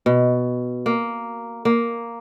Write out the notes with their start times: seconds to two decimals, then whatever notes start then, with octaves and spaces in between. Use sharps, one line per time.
0.06 B2
0.86 A#3
1.65 A#3